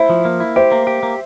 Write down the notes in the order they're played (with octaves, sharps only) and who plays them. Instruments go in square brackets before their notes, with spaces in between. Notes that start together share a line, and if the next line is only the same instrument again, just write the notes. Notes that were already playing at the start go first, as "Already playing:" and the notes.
Already playing: [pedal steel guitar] E4 [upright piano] C5 E5
[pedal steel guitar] F3
A#3
E4
[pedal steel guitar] G4 [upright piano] C5 E5
[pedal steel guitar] A#3
G4
A#3